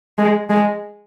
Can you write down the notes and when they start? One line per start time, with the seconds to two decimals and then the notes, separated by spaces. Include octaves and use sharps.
0.18 G#3
0.50 G#3